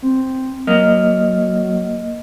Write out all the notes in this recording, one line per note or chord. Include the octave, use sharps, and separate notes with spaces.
C4
F#3 A#3 D#5 F6